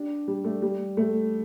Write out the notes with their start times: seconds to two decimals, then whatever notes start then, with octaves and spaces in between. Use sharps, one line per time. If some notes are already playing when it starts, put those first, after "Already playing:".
Already playing: D4 G4
0.28 G3
0.44 A3
0.62 G3
0.97 A3